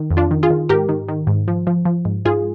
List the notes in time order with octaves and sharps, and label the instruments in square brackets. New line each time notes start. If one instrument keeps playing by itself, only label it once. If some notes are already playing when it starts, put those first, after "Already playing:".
Already playing: [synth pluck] D#3
F2
D4 F4
D#3
F4 G#4
D#3
G#2 G4 A#4
D#3
D#3
G#2
F3
F3
F3
G#2
G#2 F4 G#4